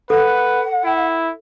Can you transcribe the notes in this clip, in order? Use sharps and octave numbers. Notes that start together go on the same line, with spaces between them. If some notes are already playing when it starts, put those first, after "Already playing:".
A4 B4 F#5
E4